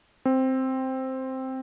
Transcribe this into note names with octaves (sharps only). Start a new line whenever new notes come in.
C4